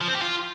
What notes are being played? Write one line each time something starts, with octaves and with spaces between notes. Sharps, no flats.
F3
C4
G4
F4